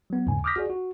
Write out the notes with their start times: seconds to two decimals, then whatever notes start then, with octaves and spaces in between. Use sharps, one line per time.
0.10 F#3 B3
0.27 D#2 G#2 C#3 G#5
0.44 D6 D#6 F6 G6 A#6 B6
0.56 F#4 G#4 D5
0.70 F#4